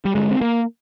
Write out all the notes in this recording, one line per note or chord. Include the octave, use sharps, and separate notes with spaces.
G3
G2 D3 G#3
C4
A#3